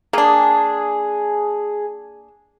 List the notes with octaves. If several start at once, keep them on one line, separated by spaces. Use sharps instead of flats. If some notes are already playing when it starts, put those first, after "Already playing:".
A#3 D4 G#4